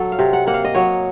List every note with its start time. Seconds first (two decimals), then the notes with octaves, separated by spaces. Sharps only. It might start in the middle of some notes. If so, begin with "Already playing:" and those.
Already playing: F#3 A4
0.12 F5
0.19 C3
0.33 F#5
0.47 A#3 F#5
0.54 F5
0.64 D#5
0.74 F#3 C#5